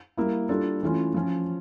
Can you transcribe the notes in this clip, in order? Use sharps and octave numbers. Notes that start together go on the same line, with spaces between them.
G3 A#3 E4
G3 D4 F4 A4
E3 A3 C#4 F4
F3 C#4 F4